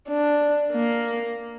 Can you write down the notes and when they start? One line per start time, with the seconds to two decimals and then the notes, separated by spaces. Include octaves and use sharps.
0.09 D4
0.72 A#3